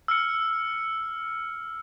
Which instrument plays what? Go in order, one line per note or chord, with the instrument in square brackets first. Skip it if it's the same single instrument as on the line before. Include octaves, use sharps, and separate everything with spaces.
[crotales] E6 F6 C#7